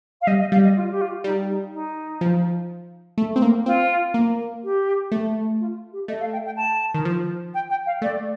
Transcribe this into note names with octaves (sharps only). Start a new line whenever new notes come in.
F5
G3 D#5
D#5
G3 F5
D#5
F4
G4
F4
G3 D#4
D#4
D#4
F3
A3
C4
A#3
C4 F4
A#3
G4
A3
F4
G4
A3 D#5
F5
G5
G5
A5
D#3
F3
G5
G5
F5
A3 D5